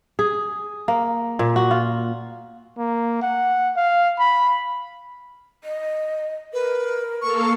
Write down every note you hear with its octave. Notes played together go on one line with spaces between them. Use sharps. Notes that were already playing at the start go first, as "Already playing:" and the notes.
G#4
A#3
A#2
F#4
F4
A#3
F#5
F5
B5
D#5
A#4 B4
A#3 A4 F5 C#6